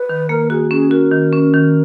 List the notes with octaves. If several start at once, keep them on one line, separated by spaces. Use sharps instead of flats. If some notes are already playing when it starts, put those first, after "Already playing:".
Already playing: B4
D#3
A#3 A#4
F#4 G#4
C#4 G#4
F#4 A#4
D#3
C#4
D#3